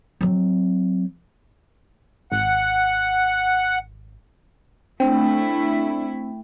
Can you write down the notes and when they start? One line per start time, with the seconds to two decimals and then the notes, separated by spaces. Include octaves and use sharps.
0.21 F#3 C4
2.32 G#1 F#5
5.00 A3 C4 D4 E4 G5